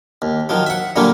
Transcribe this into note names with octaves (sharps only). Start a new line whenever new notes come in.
D#2
D#3 F3 F#3
E5 F#5
A#2 D3 F#3 G3 A#3